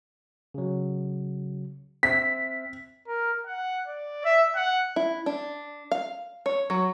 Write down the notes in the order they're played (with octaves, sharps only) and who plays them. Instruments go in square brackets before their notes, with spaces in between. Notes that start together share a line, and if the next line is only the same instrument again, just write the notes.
[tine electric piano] C#3 F#3
[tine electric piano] C4 E5 [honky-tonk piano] B6
[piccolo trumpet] A#4
F#5
D5
E5
F#5
[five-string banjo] E4
D4
F5
C#5
F#3